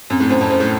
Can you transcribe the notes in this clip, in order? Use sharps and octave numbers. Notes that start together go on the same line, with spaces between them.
F#2 C4
A2
F#2 C5
F2
F#2 C5
A2